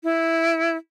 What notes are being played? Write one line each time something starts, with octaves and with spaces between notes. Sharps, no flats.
E4